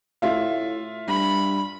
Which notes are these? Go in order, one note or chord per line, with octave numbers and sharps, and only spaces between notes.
A2 F4 E5 F5
G2 B5